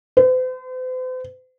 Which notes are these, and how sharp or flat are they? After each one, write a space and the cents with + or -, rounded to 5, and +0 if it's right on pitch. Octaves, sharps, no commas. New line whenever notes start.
C5 -45